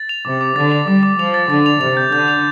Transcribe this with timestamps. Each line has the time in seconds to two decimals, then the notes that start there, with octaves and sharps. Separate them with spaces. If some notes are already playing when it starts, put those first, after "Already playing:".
Already playing: A6
0.09 F7
0.25 C3 D6
0.41 D6
0.56 D3 A6
0.72 F7
0.88 G3 D6
1.03 D6
1.18 F3 F7
1.34 A6
1.49 D3 A6
1.66 F7
1.81 C3 F7
1.97 G6
2.13 D3 G6
2.28 F7